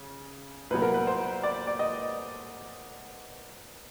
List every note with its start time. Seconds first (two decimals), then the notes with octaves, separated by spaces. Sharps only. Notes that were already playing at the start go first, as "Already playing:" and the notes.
Already playing: C#3
0.71 C2 A#2 F#3 B3 B4
0.82 A#4
0.94 B4
1.07 C5
1.43 D5
1.67 D5
1.79 D#5